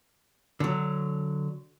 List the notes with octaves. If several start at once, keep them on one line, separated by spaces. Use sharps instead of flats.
D3 F#3